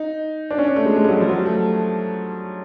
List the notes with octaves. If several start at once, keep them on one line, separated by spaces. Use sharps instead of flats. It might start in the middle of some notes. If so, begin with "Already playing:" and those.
Already playing: D#4
D4
C#4
D4
A3
G#3
G#3
G3
F#3
F3
F#3
G3
A3